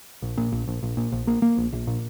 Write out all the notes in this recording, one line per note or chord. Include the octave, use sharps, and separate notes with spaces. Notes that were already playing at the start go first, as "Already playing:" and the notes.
A#1
A#2
A#1
A#1
A#1
A#2
A#1
A#3
A#3
A#1
A#1
A#2